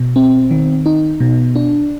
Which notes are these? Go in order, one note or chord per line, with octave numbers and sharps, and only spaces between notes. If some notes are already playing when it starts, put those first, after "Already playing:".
Already playing: B2
C4
D#3
D#4
B2
D4